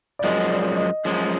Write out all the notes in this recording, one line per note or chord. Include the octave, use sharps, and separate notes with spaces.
D5
F#2 F3 G#3 D#5
D5
D5
D#5
F#2 F3 G#3